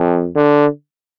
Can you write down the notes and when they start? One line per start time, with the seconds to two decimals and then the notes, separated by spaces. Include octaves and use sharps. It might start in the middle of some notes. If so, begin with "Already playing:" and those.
Already playing: F2
0.35 D3